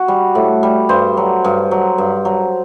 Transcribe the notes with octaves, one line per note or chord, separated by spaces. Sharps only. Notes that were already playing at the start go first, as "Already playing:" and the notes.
Already playing: F#4
G3
A2
G3
G2 C5
F#3
G2
F#3
G2
F#3